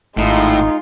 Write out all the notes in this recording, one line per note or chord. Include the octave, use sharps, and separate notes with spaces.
G#1 A2 G#3 D#4 F4